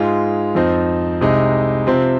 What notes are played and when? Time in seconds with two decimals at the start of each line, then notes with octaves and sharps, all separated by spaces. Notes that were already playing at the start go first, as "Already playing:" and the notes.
Already playing: G#2 G#3 F4
0.55 F2 F3 C4 D#4
1.21 C2 C3 G#3 D#4
1.87 C3 F3 C4